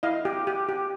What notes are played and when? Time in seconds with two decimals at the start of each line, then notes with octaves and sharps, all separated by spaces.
0.03 E4 D#5 F5
0.25 G4
0.47 G4
0.69 G4